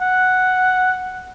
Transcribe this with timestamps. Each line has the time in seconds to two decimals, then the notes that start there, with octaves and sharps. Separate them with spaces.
0.01 F#5